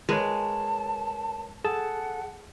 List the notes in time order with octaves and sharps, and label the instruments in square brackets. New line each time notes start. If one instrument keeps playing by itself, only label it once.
[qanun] G#3 [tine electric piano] A#4 B4 C#5 [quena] A5
[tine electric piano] G#4 A4 A5 [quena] F#5